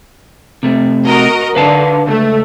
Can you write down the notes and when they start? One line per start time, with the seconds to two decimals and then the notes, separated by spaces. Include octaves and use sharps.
0.63 C3 A3
1.07 F#4 A#4 D#5
1.55 D3 B4 F5 A5
2.07 C#2 A3